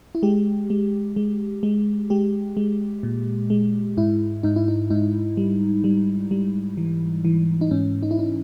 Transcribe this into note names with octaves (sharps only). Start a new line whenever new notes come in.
E4
G#3 G4
G#3
G#3
G#3
G#3 G4
G#3
A#2
G#3
G#2 E4
G#2 D#4
E4
D#4
G#2 D#4
G3
G3
G3
E3
E3
D#4
G#2 C#4
D#4
E4
D#4